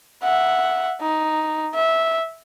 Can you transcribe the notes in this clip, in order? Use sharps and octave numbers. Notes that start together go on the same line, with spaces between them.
E5 F#5
D#4
E5